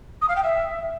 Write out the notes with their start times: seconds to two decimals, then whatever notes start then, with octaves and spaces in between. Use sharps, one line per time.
0.21 D#6
0.28 F5
0.35 G5
0.42 E5